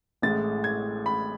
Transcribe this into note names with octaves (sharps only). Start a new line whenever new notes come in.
A1 A2 G#3 A6
G#6
B5